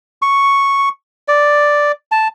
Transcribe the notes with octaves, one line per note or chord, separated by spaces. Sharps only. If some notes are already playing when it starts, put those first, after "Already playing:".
C#6
D5
A5